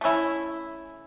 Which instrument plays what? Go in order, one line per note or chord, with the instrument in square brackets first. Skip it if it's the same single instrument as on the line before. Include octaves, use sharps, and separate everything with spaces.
[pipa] A3 C#4 E4